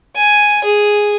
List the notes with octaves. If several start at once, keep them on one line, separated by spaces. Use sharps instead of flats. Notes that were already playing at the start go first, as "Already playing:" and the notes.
G#5
G#4